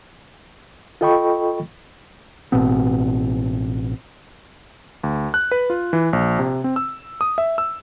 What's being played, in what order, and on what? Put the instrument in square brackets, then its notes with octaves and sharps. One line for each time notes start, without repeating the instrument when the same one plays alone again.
[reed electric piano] F4 A4 D#5 G5 B5 C#6
[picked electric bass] A1 B2 B3 C4
[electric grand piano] D2
F#6
B4
F4
E3
A#1
C3
C4
E6
D#6
E5
E6